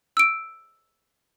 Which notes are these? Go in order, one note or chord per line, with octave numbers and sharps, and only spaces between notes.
E6 D7